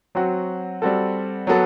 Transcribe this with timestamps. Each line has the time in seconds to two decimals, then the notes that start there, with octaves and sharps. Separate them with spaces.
0.15 F#3 C4 F#4
0.82 G3 C4 F#4 A4
1.47 F#3 B3 F#4 A4